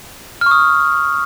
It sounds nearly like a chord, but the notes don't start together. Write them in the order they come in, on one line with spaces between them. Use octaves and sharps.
F6 C#6 D#6